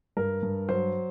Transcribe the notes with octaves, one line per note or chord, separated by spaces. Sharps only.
G2 A#4
G2
F#3 C5